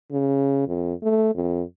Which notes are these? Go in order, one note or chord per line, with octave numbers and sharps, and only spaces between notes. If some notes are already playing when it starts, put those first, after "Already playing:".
C#3
F2
A3
F2